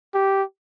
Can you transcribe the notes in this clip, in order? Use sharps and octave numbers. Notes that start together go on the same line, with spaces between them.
G4